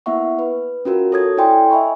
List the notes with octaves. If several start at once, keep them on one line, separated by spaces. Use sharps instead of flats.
A#3 B3 E4 E5 F#5 C#6
B4
C#4 F4 F#4 A#4
A4 C#5 D#6 G#6
E4 A4 D5 G5 G#5 C6
D#5 E5 G#5 B5 C#6